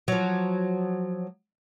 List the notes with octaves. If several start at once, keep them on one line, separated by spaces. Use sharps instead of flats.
F3 F#3